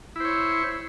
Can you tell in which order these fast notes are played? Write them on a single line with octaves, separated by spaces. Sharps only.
E4 C5 C#5